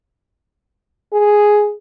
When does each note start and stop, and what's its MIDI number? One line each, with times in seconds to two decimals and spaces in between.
1.13 1.72 68